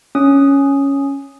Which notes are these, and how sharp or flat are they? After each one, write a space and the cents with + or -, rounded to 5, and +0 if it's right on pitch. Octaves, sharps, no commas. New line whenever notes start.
C#4 +0 D#6 +0